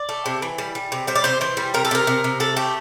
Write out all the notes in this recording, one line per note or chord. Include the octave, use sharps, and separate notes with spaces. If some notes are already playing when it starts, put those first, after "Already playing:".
Already playing: D5
A3
C3
E3
G3
G3
C3
G3 C5
D5
C3 C5
E3 C5
G3
C3 A#4
A4
C3 A#4
C3
C3
A3 A4
A3 G4